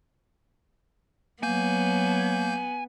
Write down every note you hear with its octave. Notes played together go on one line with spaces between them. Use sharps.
F#3 A#3 B3 G#5 G6